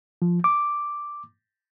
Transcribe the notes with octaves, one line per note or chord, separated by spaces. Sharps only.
F3
D6